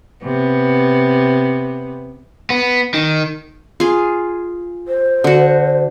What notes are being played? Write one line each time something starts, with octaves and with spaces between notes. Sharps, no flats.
C3 B3
B3
D#3
F4 G#4
C5
D3 F#4